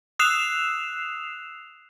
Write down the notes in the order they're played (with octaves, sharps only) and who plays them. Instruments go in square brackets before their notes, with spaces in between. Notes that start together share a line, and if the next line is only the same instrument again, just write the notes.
[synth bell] D#6 E6 F#6 C7 E7 F7